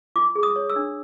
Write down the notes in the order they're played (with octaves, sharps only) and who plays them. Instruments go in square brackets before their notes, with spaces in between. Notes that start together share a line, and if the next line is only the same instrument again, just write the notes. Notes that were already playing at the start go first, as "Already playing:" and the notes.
[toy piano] F4 D6
G#4
D#6
C#5
E6
D4